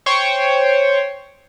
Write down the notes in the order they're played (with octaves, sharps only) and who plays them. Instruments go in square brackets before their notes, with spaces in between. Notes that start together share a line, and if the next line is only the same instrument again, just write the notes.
[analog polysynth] C5 C#5 G5